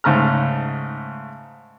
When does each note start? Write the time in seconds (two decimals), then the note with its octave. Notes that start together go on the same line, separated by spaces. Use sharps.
0.04 G#2 C#3 A3 A#5 F6